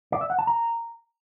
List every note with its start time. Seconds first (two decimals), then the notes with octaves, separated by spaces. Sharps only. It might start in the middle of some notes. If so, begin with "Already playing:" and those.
0.12 D5
0.21 E5
0.30 F#5
0.39 A5
0.47 A#5